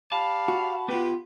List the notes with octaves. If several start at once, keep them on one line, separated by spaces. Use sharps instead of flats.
G4 D5 F5 A5 B5
F#4
B3 F4 G4 B4